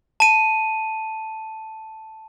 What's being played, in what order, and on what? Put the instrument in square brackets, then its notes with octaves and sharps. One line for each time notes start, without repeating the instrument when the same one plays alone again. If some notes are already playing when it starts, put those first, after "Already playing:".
[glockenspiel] A5 D#7